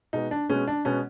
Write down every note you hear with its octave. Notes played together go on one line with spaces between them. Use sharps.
B2 G#3 B3 D#4
D4
B2 G#3 B3 C#4
D4
B2 G#3 B3 C#4